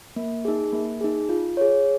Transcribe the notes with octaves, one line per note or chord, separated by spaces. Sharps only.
A#3
D#4 G#4
A#3
D#4 G#4
F4
G#4 C#5